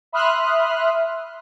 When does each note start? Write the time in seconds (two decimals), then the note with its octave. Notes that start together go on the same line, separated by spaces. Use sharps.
0.12 E5 B5 C6 D#6 F6 F#6